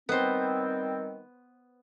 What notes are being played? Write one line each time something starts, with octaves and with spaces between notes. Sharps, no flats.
D#3 G3 B3 C4 C5